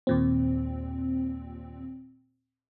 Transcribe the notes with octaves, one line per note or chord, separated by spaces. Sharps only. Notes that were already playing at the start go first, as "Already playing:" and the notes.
D#2 A#2 C4